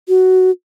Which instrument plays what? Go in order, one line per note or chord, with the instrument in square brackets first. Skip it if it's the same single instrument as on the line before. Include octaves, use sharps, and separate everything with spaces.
[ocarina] F#4